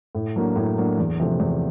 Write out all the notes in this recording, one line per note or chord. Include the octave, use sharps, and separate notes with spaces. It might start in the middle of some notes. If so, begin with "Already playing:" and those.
A2
F#3 A#3 D4
A2
F#3 A#3 D4
E2
C3 F3 A3
E2